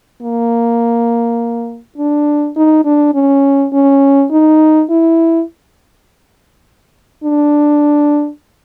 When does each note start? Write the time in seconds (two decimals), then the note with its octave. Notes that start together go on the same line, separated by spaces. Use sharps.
0.22 A#3
1.98 D4
2.56 D#4
2.85 D4
3.14 C#4
3.73 C#4
4.31 D#4
4.90 E4
7.24 D4